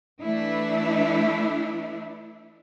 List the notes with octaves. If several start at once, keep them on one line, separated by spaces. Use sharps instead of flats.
E3 A3 D4 E4